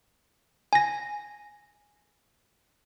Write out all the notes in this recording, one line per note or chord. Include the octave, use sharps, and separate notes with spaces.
G#5 A#6